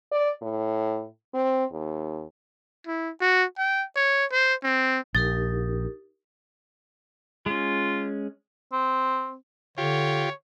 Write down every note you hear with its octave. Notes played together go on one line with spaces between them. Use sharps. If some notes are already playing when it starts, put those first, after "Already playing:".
D5
A2
C4
D#2
E4
F#4
G5
C#5
C5
C4
A#1 D#4 G4 A#4 A6
G#3 C#4 F4
C4
D3 F4 G4 C#5